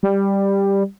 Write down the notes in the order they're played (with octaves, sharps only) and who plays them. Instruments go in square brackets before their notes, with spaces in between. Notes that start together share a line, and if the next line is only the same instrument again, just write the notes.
[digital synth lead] G3